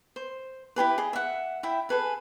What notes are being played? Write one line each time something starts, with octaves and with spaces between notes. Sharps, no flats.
C5
E4 G4 G#4 B4
G#4 D#5
E5 F#5
E4 E5 G5
G#4 A4 B4 G#5